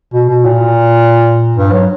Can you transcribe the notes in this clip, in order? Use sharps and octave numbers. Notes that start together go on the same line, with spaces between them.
B2
B2
A#2
G2
F#3